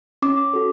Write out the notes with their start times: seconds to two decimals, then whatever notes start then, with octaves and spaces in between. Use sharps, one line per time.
0.22 C#4 D6
0.53 F#4 A4